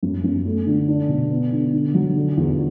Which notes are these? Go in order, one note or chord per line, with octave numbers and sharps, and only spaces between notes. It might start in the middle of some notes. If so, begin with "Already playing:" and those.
F#2
F#2
A3
D3
D4
B2
B3
D3
D3
F#3
D3
E2